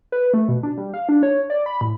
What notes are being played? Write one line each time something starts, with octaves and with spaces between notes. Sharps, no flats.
B4
A3
B2
D4
G3
F5
D4
C#5
D5
B5
A2